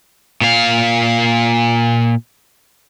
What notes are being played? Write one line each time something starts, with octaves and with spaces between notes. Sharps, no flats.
A#2 F5